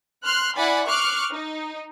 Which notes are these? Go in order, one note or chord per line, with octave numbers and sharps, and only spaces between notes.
C6 F6 F#6
E4 D5 F#5 G#5 B5
C#6 D6 F6 F#6 C7
D#4